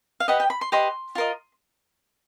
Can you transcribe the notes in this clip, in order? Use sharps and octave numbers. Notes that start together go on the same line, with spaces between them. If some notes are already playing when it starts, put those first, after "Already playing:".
F5
G4 B4 D#5 F#5
G5
B5
C6
G4 B4 D#5 C6
F4 A#4 D#5